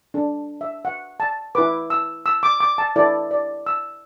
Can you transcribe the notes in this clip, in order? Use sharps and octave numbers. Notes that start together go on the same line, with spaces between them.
D4 A4
E5
F#5
A5
E4 B4 D6
E6
E6
D6
D6
A5
E4 A4 D5
D5
E6